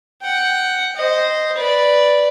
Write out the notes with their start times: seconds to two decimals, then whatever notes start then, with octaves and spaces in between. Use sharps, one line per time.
0.22 F#5 G5
0.96 C5 D#5
1.57 B4 D5